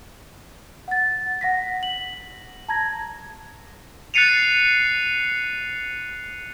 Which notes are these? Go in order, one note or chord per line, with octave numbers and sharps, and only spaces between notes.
F#5 A6
F#5 A#6 B6
F#7
A5 A#5 G#6 A#6
F#6 A6 C7 C#7 D#7 F7